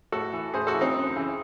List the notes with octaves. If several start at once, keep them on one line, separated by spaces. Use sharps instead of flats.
A2 F#4 A4
E3
A2 G#4 C5
F#4 A4
E3
C4 D#4
F#2
C#3 E3